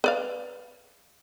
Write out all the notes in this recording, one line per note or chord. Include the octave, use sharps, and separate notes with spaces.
B4 D5 F5